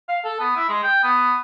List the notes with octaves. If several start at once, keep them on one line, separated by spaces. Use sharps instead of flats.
F5
A4
B3
E4
G#3
G5
B3